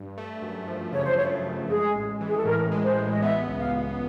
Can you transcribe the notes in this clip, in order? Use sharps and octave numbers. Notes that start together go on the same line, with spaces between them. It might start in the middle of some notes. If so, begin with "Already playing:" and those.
Already playing: G2
A3
F#2
F3
C#3 C#5
C5
A3 C#5
F#2
G#3 G#4
A1
E3
G#4
A4
A2 A#4
G#3
C5
A1
D#5
B3 E5
C#2
F5